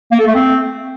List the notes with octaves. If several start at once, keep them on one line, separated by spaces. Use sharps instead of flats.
A#3
A4
A3
C4